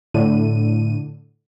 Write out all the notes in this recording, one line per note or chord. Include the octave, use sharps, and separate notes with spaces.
A2 D3 D#7